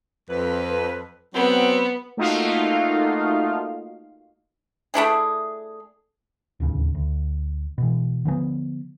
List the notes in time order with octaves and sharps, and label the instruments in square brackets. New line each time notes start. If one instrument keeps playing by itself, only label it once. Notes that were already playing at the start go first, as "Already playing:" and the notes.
[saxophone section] F2 B4
[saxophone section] F#3 C4 [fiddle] B3
[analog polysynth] A3 A#3 D#4 F4 F#4 F5
[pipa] A3 D4 E4 G#4
[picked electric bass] D1 D#2 C#3
D2
B2 E3
D3 F3 A3 B3